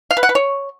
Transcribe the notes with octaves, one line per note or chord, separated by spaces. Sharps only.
F5
B4
F#5
B4
C#5